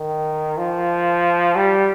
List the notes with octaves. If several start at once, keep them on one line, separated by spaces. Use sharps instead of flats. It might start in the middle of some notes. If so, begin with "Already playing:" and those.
Already playing: D#3
F3
G3